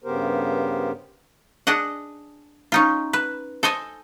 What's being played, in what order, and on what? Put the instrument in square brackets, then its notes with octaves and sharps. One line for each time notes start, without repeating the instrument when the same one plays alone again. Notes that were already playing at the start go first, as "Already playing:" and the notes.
[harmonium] G2 C#3 B3 G4 A#4 C5
[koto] D4 G#4 D#5 F#5
C#4 D#4 F4
B4
A4 C5 D#5 G#5